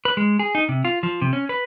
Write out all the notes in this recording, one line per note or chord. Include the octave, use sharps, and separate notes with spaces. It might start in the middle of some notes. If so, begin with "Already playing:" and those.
B4
G#3
G#4
D#4
C3
F4
F3
C3
C#4
B4